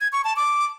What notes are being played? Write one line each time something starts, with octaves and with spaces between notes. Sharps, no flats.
G#6
C#6
A5
D6